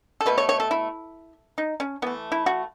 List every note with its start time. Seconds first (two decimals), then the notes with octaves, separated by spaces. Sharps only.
0.21 A4
0.26 B2 A3 B4
0.38 C#5
0.49 C#5
0.60 A4
0.71 E4
1.58 D#4
1.80 C#4
2.02 E3 A3 B3
2.32 E4
2.46 F#4